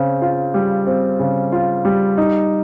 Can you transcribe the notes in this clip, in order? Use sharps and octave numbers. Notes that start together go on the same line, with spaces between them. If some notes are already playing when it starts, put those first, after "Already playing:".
Already playing: C#3 C4
F4
G3
C4
C#3
F4
G3
D#4